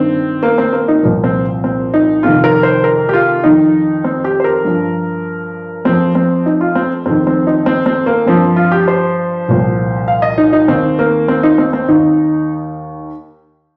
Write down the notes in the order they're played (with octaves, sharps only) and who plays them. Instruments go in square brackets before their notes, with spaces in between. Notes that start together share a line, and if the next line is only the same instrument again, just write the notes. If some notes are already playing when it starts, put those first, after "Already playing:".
Already playing: [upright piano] G2 D#3 C4
A#3
C4
A#3
D#4
C2 A#2 F3 A#3
C4
C4
D#4
F2 C3 D#3 F4
A#4
C5
A#4
G4
F4
F2 D#3 D#4
C4
G4
C5
A#4
G2 F3
F2 F3 C4
C4
D#4
F4
C4
F2 D#3 C4
C4
D#4
C4
C4
A#3
G2 F3 C4
F4
G4
C5
C2 A#2 F3
F5
D#5
D#4
D#4
D#2 D#3 C4
A#3
C4
D#4
C4
C4
D#2 D#3 D#4